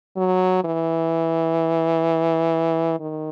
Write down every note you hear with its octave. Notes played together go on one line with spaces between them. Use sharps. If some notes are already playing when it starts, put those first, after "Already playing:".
F#3
E3
D#3